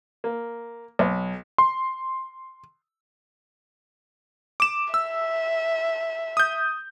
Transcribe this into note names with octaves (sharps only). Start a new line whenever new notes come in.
A#3
B1
C6
D6 E7
E5 E6
D#6 G6